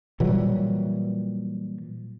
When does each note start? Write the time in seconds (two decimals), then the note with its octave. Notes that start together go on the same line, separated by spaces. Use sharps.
0.20 A#2 E3 F#3 G3